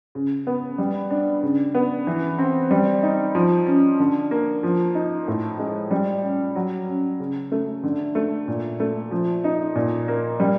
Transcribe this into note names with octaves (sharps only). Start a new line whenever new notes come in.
C#3
B3
G3
D4
C#3
B3
E3
C4
G3
D#4
F3
C#4
D3
A#3
F3
D#4
A2
G#3
G3
C#4
F#3
C#4
C#3
A3
D3
A3
A#2
A3
F3
D#4
A#2
A#3
G3